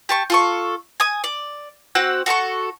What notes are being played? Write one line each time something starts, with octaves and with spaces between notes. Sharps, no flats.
G4 A5 C#6
F4 A4 C#6
G#5 D#6
D5
C4 F#4 F#5 E6
F#4 A4 A#5 C#6